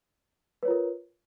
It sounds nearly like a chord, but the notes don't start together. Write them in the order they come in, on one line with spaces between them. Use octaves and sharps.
B4 C#5 F4 A#4